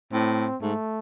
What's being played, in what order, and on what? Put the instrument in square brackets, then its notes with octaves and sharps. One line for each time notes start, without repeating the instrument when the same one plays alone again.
[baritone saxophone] A2 [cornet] C4
[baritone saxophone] G#2 [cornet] A3